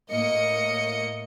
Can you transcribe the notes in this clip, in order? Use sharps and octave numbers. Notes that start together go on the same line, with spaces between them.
A2 A#3 D#5 C#7